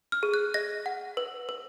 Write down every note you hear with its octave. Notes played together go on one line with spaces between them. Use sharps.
F6
G#4
F#6
D#5 A#6
F#5
B4
B4